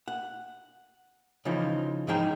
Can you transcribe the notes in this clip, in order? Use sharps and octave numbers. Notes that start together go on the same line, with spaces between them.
F#5
C#3 E3 F3 D#4 F4
G#2 F3 D#4 G#4 G5 A#5